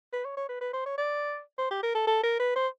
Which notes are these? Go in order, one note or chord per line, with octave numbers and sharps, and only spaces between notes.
B4
C#5
C#5
B4
B4
C5
C#5
D5
C5
G4
A#4
A4
A4
A#4
B4
C5